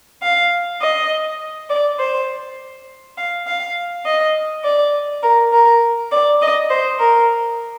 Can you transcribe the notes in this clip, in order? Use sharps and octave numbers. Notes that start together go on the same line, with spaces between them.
F5
D#5
D5
C5
F5
F5
D#5
D5
A#4
A#4
D5
D#5
C5
A#4